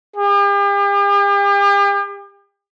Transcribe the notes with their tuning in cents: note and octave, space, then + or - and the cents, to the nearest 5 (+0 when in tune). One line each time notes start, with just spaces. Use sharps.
G4 +40